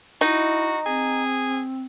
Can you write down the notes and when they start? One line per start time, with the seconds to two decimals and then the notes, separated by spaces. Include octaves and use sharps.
0.21 D#4 E4 F#4
0.86 C4 G#4